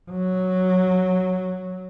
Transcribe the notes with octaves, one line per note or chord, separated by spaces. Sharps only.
F#3